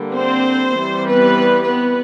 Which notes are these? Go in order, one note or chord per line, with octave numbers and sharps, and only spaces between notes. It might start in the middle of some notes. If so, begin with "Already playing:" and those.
Already playing: D3 G3 A#3
C4 C5
E3 G3 C4
B3 B4
B3 B4